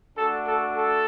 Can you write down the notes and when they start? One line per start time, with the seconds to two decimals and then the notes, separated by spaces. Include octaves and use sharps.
0.16 A3 D4 F#4 A4
0.46 A4
0.76 A4